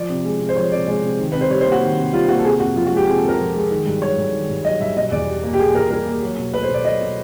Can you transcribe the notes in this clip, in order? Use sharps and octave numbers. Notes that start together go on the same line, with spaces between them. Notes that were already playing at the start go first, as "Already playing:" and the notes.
Already playing: F3 D5
C3
G#3
C3
C5
F3 C#5
C3 D5
G#3 D5
C3
D#3
C3 B4
C5
G3 C#5
C5
A#3
F#4
D#3
C3
G3 F4
A#3 F#4
A4
C3 G#4
F2 F#4
F3 F4
F#4
G#3 G4
C3 G#4
A4
F2
A#4
F3
G#3
D#3
G2
F#3 C#5
G2
D#3
G2
F#3 D#5
G2 E5
B2 D#5
E2 D5
G3
A#3
G4
B2 G#4
E2 A#4
G3 A#4
A#3
F#3
B2
A3 B4
C5
B2
D5
F#3 D#5
B2